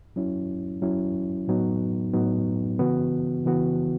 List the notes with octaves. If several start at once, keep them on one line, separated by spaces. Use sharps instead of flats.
F#3 C#4 E4
F#3 C#4 E4
A2 F#3 B3 D#4
A2 F#3 B3 D#4
C#3 E3 B3 F#4
C#3 E3 B3 F#4